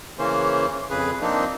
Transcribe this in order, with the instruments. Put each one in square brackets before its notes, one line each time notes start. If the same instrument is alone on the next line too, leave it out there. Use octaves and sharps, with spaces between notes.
[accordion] C#3 E3 A#3 C#4 C5
F2 C#3 G#4 B4
F3 A#3 C4 D4 D#4